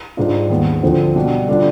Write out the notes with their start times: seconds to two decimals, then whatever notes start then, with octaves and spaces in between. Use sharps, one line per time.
0.17 G#2 G3 D4 F4
0.50 D#2 D#3 G#3 B3
0.83 D2 D3 F3 C4
1.16 B2 G3 D4
1.48 D3 G3 D4 F4